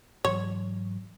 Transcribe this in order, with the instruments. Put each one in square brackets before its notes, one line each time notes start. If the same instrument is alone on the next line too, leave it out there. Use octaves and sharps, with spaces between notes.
[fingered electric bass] G#2 E3 F#3 [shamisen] C#5